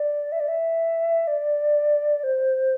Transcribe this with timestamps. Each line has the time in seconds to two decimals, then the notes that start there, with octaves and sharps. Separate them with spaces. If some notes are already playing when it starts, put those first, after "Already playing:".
Already playing: D5
0.32 E5
0.40 D5
0.48 E5
1.27 D5
2.23 C5